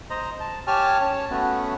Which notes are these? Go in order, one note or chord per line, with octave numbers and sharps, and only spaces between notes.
C5 D#5 A#5
A5
G4 C#5 G#5 A5 F6
C#4 C#5 A5
A3 B3 C#4 F#4